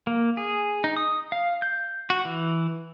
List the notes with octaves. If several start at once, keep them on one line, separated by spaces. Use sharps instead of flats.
A#3
G#4
D#4
D#6
F5
G6
F#4
E3